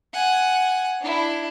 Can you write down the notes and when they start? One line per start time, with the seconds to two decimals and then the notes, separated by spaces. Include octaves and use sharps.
0.13 F#5 G#5
1.02 D4 E4